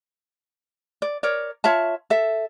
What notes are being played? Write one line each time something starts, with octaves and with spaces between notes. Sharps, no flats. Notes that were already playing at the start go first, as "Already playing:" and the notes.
D5
A#4 C#5 D5
F4 C#5 E5 A5
A4 E5